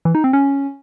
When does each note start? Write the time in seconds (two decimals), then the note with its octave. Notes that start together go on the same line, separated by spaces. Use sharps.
0.05 E3
0.15 D#4
0.24 C4
0.33 C#4